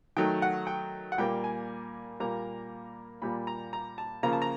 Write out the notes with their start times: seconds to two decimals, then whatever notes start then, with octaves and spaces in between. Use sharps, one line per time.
0.17 D#3 F#3 A3 G5
0.42 F#5
0.67 G5
1.12 F#5
1.18 A#2 G3 A#3 G5
1.44 G#5
2.20 A#2 G3 A#3 A#5
3.22 A#2 G3 A#3 B5
3.47 A#5
3.73 A#5
3.98 A5
4.23 C#3 F3 A#3 A#5
4.33 A5
4.42 A#5